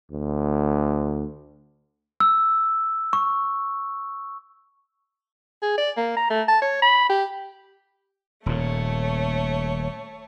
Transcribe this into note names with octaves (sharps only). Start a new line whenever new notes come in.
D2
E6
C#6
G#4
D5
A#3
A#5
A3
A5
C#5
B5
G4
D#1 A#2 A3 C#5